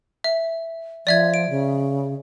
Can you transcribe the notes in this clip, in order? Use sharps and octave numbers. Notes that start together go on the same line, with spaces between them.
E5
F3 D5 E5 G#6
D7
C#3